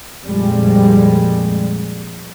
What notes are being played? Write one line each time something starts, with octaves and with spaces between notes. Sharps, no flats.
F2 A#2 G3 G#3